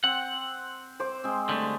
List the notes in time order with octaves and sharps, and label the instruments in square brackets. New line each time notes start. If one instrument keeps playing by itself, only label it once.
[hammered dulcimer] C4 [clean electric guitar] F#5
[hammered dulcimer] C5 D6
G#3 C4
[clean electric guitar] D3 G3 A3